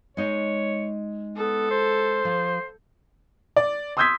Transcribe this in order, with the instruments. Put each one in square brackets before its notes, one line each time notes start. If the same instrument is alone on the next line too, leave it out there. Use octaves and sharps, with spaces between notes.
[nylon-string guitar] G#3 D#4 D#5 [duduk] C#5
[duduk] B3 [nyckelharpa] A4
[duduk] C5
[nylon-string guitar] F3
[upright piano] D5
C6 D#6 E6 G6 G#6 B6